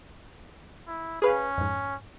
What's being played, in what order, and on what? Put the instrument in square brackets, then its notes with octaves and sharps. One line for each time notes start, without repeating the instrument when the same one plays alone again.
[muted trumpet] E4
[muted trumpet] C#4 [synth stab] G#4 B4 F5
[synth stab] F2 G#2